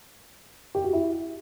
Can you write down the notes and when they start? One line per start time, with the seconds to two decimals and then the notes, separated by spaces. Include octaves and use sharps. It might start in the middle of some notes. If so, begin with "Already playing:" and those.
0.75 G4
0.84 F#4
0.93 E4